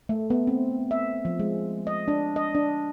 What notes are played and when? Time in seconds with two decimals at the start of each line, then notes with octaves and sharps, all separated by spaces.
0.09 A3
0.30 B3
0.47 C4
0.91 E5
1.25 F3
1.40 G#3
1.87 D#5
2.08 D4
2.36 D#5
2.55 D4